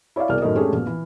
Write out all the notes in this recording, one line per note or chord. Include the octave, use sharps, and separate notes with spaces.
E4 C#5 D5 E5 F5
C2 B2 G#4 A#4 D5 F6
F#2 A2 D#3 A#4 D#5
G#3 A3 C#4 D4 G4 G#4
A#1 B2
E3